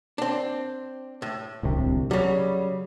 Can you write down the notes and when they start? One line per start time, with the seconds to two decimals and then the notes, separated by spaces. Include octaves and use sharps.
0.18 C4 D4
1.22 A2
1.63 D1 C2 C3
2.11 C#3 F#3 G3